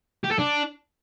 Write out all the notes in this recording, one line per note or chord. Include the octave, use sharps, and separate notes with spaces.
G4
A4
D4